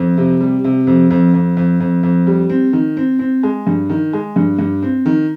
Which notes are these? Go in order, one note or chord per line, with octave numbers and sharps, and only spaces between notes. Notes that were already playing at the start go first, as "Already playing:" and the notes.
Already playing: F2
C3
G3
C3
F2
F2
F2
F2
F2
F2
G3
C4
D#3
C4
C4
G#3
G2
D#3
G#3
G2
G2
C4
D#3